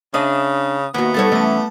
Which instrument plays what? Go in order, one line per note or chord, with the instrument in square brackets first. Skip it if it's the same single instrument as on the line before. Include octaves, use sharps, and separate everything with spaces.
[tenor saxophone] C#3 [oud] D4 D#5 [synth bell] D#6
[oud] D#2 F#4 [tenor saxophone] B3
[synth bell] G3 A6 [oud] D#4 A4 C#5
[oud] E3 C#4 D#5 [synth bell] A3 A5